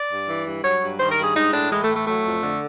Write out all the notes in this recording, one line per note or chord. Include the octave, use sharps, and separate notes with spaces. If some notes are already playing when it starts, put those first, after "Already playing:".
Already playing: D5
G2
E3
G2
F#3 C#5
G2
D#3 C5
A#4
G2
G#4
G#3 D#4
A2 D4
E3 G#3
A3
A2
A3
F#3 A3
F2
D3